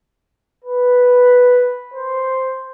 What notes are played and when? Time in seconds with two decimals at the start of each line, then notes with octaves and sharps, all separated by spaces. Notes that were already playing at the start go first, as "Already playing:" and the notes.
0.65 B4
1.94 C5